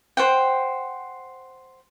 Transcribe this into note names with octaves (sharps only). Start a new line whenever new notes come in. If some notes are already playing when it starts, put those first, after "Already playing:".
C5 F#5 G5